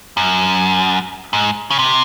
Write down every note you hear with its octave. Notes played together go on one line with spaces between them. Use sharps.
F#2
G#2
C#3
C3